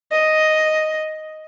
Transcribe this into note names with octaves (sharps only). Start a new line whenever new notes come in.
D#5